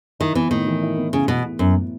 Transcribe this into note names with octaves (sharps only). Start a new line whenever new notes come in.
D#3 E4
E3 B3
A2 D#3
E3
E4
B3
A2 C#3
B2 E3
E4
F#2 B3
A2